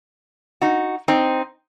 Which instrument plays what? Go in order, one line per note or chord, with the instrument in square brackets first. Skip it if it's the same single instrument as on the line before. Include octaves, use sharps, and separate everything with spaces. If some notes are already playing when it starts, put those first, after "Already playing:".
[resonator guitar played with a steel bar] D#4 F#4
C4 D#4